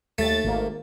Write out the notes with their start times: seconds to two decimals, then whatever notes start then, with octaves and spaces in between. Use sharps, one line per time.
0.18 D#2 A3 A6
0.44 G#1 A#3